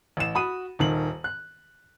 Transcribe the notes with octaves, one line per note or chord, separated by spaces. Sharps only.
A1 E7
F#4 B5 D#6 D#7
D#1 D#3 F#7
F#6